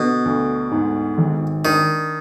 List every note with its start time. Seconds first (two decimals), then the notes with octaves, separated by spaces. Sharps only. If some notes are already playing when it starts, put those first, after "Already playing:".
Already playing: B2 D3
0.25 D2
0.71 G#2
1.18 G#1
1.65 D#3 D4